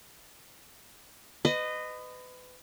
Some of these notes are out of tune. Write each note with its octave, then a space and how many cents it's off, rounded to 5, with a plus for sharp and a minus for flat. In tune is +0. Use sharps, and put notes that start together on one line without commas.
B4 +30 D#5 -15